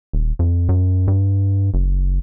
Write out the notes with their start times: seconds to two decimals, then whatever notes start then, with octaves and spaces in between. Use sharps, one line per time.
0.13 D#1
0.39 F2
0.69 F#2
1.08 G2
1.74 F#1